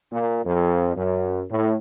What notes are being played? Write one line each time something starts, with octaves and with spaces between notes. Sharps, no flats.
A#2
F2
F#2
A2